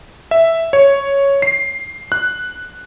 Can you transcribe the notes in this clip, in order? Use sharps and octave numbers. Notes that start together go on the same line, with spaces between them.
E5
C#5
C7
F#6